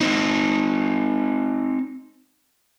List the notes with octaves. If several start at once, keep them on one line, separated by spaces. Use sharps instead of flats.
C4 D#4